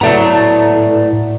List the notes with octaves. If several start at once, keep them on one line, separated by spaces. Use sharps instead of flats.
A2 F#3 A3 B3 D5 A#5